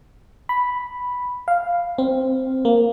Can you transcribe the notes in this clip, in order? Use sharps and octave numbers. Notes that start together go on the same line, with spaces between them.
B5
F5
C4
A#3